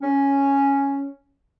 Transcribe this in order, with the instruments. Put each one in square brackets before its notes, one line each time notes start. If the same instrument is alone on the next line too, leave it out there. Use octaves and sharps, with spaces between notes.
[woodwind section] C#4